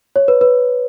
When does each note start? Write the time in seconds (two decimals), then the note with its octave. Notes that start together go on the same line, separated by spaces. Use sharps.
0.16 C#5
0.28 B4
0.41 B4